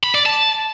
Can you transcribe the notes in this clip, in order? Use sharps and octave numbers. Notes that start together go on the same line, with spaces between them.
B5
D5
A5